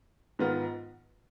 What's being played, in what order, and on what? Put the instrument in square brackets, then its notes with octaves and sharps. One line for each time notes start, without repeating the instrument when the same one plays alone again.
[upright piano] G#2 D#3 B3 F4